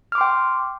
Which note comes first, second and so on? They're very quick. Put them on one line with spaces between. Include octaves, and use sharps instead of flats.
F6 D6 C6 G5